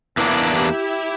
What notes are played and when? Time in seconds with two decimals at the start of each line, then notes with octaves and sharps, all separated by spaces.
0.17 E2 E3 A#3 C4 D4 E4
0.53 E4 G4